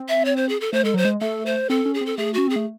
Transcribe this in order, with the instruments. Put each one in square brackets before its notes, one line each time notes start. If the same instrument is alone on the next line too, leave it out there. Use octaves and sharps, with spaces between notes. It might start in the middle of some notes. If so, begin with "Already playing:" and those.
Already playing: [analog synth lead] C4
[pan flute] E5
C#5
C5
G#4
A4
[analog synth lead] A3 [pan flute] C5
[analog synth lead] G#3 [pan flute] A4
[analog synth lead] F#3 [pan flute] C5
[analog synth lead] G#3
[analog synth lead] A3 [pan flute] A4
[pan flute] C5
[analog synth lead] C4 [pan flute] A4
[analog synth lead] C#4
[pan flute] G#4
[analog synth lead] C4 [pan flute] A4
[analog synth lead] A3 [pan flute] G#4
[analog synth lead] C#4 [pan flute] F#4
[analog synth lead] C4 [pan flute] G#4
[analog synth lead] A3